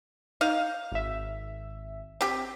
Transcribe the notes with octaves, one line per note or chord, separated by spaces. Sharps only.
D#4 F5
G#1 E5
C4 G4